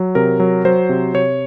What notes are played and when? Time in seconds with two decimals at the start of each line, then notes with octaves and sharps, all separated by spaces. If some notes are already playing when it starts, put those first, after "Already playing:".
Already playing: F#3
0.15 C3 A#4
0.40 F#3
0.65 F#3 C5
0.89 C3
1.14 C3 C#5